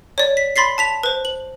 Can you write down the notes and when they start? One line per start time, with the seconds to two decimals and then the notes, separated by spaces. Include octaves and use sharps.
0.18 C#5 D5
0.37 B6
0.56 B5 C6 A6 B6 C7
0.78 A5 B6 F7
1.03 B4 C5
1.25 F#7